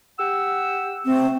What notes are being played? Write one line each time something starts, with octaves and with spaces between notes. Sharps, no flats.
G4 F#5 E6
C3 A3 C4